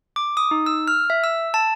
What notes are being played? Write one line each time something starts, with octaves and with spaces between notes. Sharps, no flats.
D6
D#6
D#4
E6
F6
E5
E6
A5